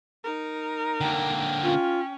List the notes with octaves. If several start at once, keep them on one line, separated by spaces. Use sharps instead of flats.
D#4 A#4
D3 A#3 G5
C#4 F4